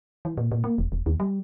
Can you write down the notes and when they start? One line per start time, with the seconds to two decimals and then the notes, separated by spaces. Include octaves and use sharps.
0.25 E3
0.37 A#2
0.52 A#2
0.64 A#3
0.78 E1
0.92 E1
1.06 D#2
1.20 G3